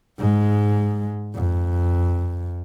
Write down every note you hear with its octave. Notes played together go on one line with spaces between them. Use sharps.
G#2 G#3
F2